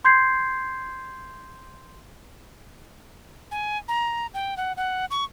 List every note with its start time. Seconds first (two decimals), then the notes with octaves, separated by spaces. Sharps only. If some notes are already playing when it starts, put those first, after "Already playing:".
0.05 C6 G6 G#6 C7
3.51 G#5
3.88 A#5
4.34 G5
4.57 F#5
4.77 F#5
5.11 C#6